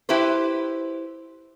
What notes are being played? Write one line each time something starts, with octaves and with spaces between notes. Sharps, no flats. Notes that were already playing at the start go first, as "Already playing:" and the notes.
E4 G4 B4 C5